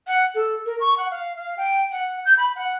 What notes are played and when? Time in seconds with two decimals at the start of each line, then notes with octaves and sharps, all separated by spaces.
0.07 F#5
0.35 A4
0.66 A#4
0.80 C#6
0.98 F#5
1.11 F5
1.36 F5
1.57 G5
1.92 F#5
2.25 G6
2.37 B5
2.56 F#5